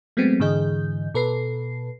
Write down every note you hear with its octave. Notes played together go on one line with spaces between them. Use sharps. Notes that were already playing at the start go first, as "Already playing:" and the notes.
F#3 G#3 A3 B3 C4
G#2 D3 E3 G#4 D#5 G6
B2 A4 B4 C7